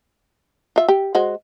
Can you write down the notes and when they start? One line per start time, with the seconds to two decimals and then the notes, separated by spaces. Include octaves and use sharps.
0.76 F4 E5
0.88 G4
1.15 G#3 F#4 C5